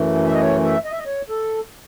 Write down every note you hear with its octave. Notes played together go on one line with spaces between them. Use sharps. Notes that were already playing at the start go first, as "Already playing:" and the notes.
Already playing: F#2 E3 A3
E5
D#5
C#5
E5
D#5
E5
D#5
C#5
A4